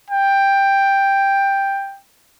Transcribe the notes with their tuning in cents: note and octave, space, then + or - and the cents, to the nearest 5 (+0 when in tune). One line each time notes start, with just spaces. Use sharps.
G5 +10